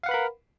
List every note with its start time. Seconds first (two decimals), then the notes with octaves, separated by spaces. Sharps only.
0.03 F5
0.06 F#5
0.09 B4
0.11 B5
0.14 A#4